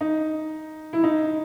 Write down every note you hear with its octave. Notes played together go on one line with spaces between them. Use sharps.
D#4
E4
D#4